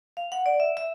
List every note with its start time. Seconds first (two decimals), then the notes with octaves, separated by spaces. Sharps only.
0.17 F5
0.32 F#5
0.46 D5
0.60 E5
0.77 E5